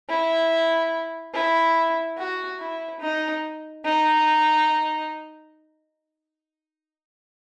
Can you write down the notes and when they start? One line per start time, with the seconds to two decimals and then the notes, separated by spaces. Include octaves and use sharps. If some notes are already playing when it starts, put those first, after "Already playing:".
0.09 E4
1.34 E4
2.17 F#4
2.59 E4
3.00 D#4
3.85 D#4